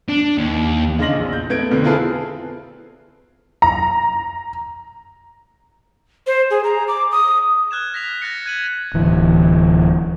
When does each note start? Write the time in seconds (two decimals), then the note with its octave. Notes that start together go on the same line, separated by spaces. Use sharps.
0.09 D4
0.38 D#2
0.99 C#3 D4 D#5 C6 A#6 F#7
1.13 A#1 E2
1.33 G6
1.50 A3 B3 G#6 D7
1.70 F2 B2 D3
1.84 C4 E4 F4 G#4 A4 B4
3.62 A#5
6.27 C5
6.51 G#4
6.64 A#5
6.88 D6
7.12 D#6
7.71 F6 F#6 G#6 E7
7.94 A#6 B6 F7
8.22 F#6 A6 A#6 C#7
8.46 G#6 D#7 F#7
8.94 D1 E3